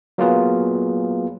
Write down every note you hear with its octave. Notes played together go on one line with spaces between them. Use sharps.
F#3 A#3 B3 F4 G#4 B4